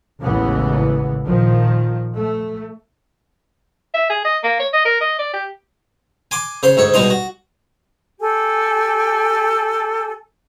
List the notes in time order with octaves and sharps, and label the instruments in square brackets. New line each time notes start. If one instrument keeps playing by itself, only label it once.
[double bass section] A1 D#2 C#3 E3 G#3 B3
A#2 D#3 F3
A3
[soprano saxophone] E5
G#4
D#5
A#3
C#5
D#5
A#4
D#5
D5
G4
[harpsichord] G#5 C6 D6
C#3 C5 C6
D2 G#2 C#5
B2 G3 G#3 D#4 C6
F#4
[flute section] G4 A4 G#5